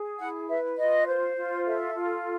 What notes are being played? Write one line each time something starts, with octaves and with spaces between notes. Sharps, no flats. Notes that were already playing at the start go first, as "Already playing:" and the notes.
Already playing: G#4
E4 F#5
B4 E5
F4 D#5
C5
F4
A4 E5
F4